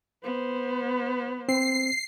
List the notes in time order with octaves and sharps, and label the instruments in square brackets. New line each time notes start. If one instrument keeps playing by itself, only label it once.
[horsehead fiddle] B3 C5
[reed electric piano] C4 [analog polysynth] C7